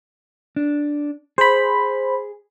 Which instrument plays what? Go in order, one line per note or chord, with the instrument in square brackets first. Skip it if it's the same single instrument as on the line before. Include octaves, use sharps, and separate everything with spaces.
[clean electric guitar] D4
[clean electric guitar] G#4 [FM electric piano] C5 B5